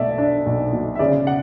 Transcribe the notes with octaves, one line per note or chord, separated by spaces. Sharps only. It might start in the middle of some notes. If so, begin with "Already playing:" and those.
Already playing: B1 B2 A3 D5 E5
D4
B1
B2
E5
C#3 D5
F#5